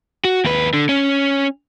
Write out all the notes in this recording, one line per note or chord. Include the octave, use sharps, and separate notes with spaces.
F#4
D#2 B4
D3
C#4